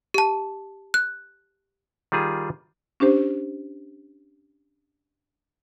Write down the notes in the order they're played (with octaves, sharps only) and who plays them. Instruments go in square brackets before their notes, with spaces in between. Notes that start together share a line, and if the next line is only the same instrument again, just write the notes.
[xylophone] G4 A5
F#6
[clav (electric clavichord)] D#3 G3 F4 G#4
[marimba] C#4 D4 G4 C5